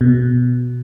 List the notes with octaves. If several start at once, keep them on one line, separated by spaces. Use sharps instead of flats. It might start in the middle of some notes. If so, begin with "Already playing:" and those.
B2